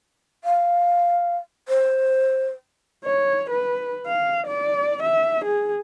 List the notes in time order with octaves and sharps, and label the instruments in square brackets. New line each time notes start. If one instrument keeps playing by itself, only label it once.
[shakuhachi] F5
C5
[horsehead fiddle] C#5
B4
F5
D5
E5
G#4